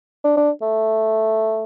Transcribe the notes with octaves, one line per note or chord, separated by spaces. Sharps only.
D4
D4
A3